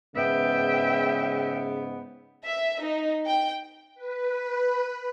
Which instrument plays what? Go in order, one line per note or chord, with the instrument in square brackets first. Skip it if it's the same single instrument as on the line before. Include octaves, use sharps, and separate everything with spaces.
[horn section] G#2 B3 [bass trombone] C#3 [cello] E5 G5
[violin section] E5
D#4
G5
[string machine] B4